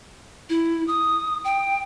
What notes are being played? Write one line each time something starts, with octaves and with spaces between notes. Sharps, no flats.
E4
D#6
G5